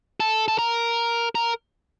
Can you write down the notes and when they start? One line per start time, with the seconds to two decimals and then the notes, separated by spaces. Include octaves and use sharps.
0.20 A4
0.48 A4
0.59 A#4
1.35 A#4